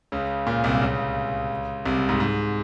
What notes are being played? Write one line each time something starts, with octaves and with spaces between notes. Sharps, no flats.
C#2 C#3
A#2
C2 C3
C#2 C#3
C2 C3
G#2
G#2